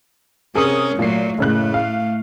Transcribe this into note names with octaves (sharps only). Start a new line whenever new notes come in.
C3 C#4 G#4 A#4 D#6
A#2 F#3 A3 C7
F#1 A2 C#3 A3 F#6
F5